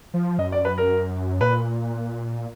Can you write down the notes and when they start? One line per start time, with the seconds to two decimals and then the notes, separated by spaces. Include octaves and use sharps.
0.14 F3
0.39 F#2 D#5
0.52 D5
0.65 B4
0.78 A#4
1.41 A#2 B4